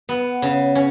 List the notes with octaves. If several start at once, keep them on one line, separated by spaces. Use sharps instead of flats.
B3
C#3
C#4